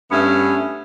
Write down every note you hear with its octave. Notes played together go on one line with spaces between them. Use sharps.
G2 A3 B3 C#4